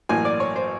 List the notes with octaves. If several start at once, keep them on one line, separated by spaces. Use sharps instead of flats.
A1 A2 F#3 A#3 G#5
D5
C#5
C5